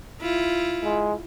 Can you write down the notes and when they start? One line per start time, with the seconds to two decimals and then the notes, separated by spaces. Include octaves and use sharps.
0.21 E4 F4
0.84 G#3